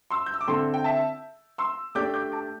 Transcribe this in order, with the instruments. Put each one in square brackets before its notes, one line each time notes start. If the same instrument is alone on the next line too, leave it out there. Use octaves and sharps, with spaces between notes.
[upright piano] C6 E6
G6
E6
D6
[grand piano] D3 C4 E4 A4 [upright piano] G5 C6
[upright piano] G5
E5 A5
C6 E6
[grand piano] A3 D4 G4 D5 [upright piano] D6 G6
[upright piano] D6 G6
A5 D6